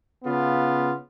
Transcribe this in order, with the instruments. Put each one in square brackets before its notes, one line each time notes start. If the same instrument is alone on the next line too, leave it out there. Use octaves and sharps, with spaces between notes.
[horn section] C#3 B3 F4